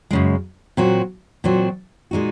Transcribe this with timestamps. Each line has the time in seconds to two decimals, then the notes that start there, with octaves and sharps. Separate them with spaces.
0.11 F#2 C#3 G#3
0.77 A#2 F#3 C4 F#4
1.44 A#2 F#3 C4 F#4
2.11 A#2 G#3 D#4 F#4